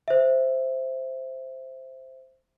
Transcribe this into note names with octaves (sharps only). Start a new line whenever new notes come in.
C5 E5